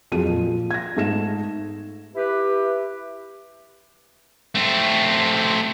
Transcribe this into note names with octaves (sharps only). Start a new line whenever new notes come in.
F2 F#3 F4 G#4 D#7
A#2 F3
G#6 A#6
G#2 A3 A#6 E7
E4 G4 B4
A3 C4